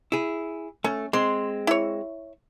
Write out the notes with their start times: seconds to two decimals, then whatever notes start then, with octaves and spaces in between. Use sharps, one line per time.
0.12 E4 G#4
0.84 A3 C#4
1.13 G#3 C4 C6
1.67 E4 C#5